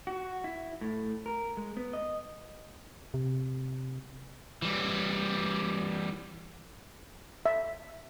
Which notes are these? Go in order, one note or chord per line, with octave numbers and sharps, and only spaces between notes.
F#4
E4
A2
A#4
G#3
B3
D#5
C3
E3 G3
E5